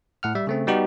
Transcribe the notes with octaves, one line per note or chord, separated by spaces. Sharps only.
A2 F#5 F6
G3 E5
C#3 A3 C4
G3 B3 D#4 F#4 G4